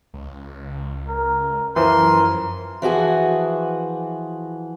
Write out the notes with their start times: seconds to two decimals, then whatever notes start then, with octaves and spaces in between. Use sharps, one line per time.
0.14 C#2
1.08 A#4
1.76 F#2 E3 F3 A#4 C6
2.82 E3 F3 F#4 G#4